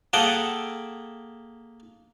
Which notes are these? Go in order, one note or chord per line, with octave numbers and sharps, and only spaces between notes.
A#3 G#4 A4 E5 F#5 G5